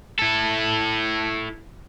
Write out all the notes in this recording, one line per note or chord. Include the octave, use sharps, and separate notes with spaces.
E4 A4